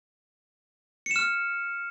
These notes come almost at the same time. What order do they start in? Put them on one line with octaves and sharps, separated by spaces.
C#7 E7 F6